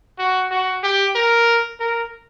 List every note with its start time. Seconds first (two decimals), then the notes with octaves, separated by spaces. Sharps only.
0.19 F#4
0.51 F#4
0.83 G4
1.15 A#4
1.80 A#4